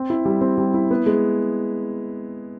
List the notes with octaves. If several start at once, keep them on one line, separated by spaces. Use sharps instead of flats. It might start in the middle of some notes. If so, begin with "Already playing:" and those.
Already playing: C4
E4
G3
C4
G3
E4
B3
G#3